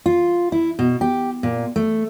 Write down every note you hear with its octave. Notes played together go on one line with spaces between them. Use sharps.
F4
E4
B2
G4
A#2
A3